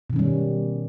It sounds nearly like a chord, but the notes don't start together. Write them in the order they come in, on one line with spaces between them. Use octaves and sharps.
B2 D#3 C#4 G3